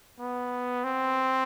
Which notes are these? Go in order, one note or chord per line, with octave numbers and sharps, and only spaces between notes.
B3
C4